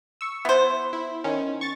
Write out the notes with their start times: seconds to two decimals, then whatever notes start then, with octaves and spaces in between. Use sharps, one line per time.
0.21 C#6 E6
0.45 B3 E4 C5
0.93 E4
1.24 D#3 C#4
1.61 C#6 A6